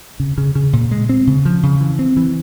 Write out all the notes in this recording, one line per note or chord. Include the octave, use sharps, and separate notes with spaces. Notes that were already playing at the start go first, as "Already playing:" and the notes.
C#3
C#3
C#3
A#2
G#3
C4
C#3
F3
C#3
E3
C4
E3